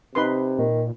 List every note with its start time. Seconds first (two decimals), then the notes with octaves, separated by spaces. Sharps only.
0.15 C3 D#4 B4 C6
0.58 A#2 D#3